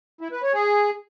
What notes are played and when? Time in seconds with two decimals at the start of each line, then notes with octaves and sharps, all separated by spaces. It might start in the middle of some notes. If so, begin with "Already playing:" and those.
0.21 E4
0.32 B4
0.42 C#5
0.53 G#4